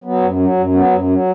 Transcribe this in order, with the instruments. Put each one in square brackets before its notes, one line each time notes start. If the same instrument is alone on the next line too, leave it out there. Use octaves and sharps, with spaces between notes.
[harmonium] F#3 B3
F#2
F#3
F#2
F#3 B3
F#2
F#3